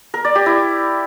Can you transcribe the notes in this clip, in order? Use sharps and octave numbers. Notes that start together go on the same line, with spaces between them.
A#4
D5
G4
E4